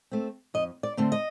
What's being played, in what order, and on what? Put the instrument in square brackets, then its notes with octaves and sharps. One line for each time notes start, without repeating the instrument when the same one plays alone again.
[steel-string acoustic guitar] A3 C4
F2 D#5
D5
D3 A3 C4
D#5